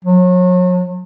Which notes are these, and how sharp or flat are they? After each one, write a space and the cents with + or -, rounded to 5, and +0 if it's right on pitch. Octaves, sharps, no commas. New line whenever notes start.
F#3 -35